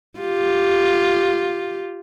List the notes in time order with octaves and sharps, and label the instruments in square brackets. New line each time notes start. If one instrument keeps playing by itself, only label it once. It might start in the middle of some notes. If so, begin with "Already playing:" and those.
[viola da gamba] F4 G4